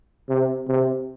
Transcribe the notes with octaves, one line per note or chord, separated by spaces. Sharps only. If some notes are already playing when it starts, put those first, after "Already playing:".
C3
C3